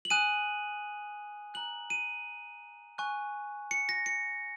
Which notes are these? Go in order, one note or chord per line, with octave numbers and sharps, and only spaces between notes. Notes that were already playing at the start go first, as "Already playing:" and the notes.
F#7
G#5 D#6 F#6 D#7
A#5 F#6 F#7
D#7
G#5 C#6 F#6
C#7
A#6
C#7